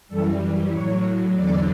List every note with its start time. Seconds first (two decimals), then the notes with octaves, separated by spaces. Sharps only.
0.08 F#2 E3 G3 A4
0.72 A2 F#3 C#5
1.34 E2 D3 F#3 D5